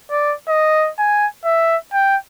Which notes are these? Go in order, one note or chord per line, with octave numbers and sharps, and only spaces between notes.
D5
D#5
G#5
E5
G5